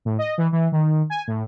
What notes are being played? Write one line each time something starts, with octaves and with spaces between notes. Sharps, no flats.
A2
D#5
E3
E3
D#3
G#5
A2